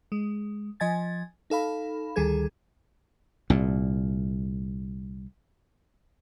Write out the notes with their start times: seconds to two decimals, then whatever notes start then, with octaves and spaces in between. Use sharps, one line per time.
0.12 G#3
0.80 F3 D#5 G#5 G#6 A6
1.50 D#4 A4 F5 B5
2.16 D2 D#3 G3 G#4 A4 G#6
3.50 C2 A#2